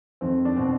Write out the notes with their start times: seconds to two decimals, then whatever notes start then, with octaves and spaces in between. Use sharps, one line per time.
0.21 F2 D#3 C4
0.45 D4
0.56 B2 C4